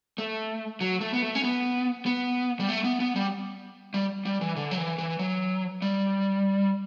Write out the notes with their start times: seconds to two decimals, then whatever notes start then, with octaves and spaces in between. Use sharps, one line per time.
0.18 A3
0.81 F#3
1.01 A3
1.14 B3
1.22 A3
1.35 C#4
1.44 B3
2.06 B3
2.60 G3
2.69 A3
2.84 B3
3.00 B3
3.16 G3
3.94 G3
4.25 G3
4.41 E3
4.56 D3
4.71 F#3
4.78 E3
4.98 E3
5.19 F#3
5.82 G3